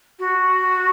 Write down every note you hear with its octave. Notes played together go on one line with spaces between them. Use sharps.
F#4